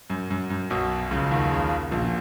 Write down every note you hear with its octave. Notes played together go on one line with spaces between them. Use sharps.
F#2
F#2
F#2
B1 B2
C#2 C#3
D#2 D#3
C#2 C#3
A#1 A#2
A#2